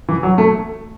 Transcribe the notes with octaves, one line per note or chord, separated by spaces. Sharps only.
E3
F#3
A3